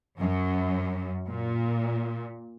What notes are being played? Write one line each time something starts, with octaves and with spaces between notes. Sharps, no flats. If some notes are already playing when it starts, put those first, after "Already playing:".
F#2
A#2